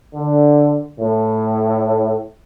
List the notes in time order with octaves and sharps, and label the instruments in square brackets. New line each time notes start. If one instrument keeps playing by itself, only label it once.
[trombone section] D3
A2